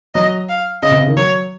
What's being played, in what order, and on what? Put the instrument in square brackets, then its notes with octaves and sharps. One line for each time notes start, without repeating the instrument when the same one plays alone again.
[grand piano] F#3 [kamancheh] D#5
[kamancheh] F5
[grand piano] C#3 [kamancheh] D#5
[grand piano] C3
C#3
D#3
[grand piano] F#3 [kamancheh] C#5